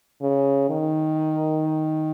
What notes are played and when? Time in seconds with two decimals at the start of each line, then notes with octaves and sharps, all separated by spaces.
0.22 C#3
0.70 D#3